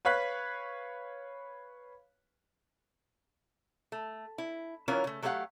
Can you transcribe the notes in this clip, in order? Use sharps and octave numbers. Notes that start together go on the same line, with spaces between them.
B4 C#5 F5 F#6 B6
A3
E4
E3 F#3 C#4 E4 F4 A#4
C#3 A3
F#3 A3 B3 G4 F5 F#5